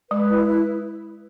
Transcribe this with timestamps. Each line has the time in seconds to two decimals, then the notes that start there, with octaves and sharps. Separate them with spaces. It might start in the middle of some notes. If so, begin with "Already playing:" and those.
0.11 G#3 B4
0.29 E4
0.47 E4